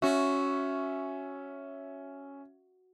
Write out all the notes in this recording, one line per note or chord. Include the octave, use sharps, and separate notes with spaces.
C#4 F#4 E5